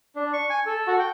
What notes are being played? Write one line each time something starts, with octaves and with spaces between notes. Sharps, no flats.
D4
C#6
G#5
A4
F#4
G5